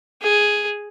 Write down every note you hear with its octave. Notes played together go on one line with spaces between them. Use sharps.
G#4